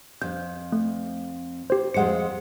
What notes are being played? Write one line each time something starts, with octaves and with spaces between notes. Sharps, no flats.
F2 G6
A3
G4 C5
F2 G#3 C5 F#5 C#7